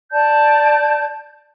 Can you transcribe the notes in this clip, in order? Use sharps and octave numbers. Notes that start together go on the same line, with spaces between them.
D5 A5 G6